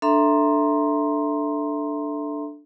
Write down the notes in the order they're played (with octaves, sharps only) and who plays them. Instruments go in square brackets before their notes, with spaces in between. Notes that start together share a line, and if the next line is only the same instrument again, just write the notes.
[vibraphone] D4 A4 E5 A#5 C6